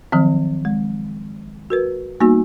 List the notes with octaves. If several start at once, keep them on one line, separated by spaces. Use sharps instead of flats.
D#3 F3 F#3 C4
G#3
F#4 A#4 B4
G3 A#3 B3 D#4 F#4